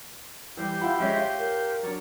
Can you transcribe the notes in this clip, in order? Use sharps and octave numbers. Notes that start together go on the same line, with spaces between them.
E3 G3 G4 C5
E4 F4 F#5 B5
F3 G#3 C#4 E5
F4 C#5
A#4
F#3 D4 C#5 D5